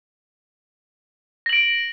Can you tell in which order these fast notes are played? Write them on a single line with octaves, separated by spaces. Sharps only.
A#6 F#7 D7